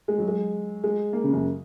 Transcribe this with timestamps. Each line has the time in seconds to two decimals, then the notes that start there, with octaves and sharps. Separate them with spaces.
0.08 G#3
0.18 F#3
0.28 G#3
0.84 G#3
1.13 A#3
1.24 C#3
1.33 F#2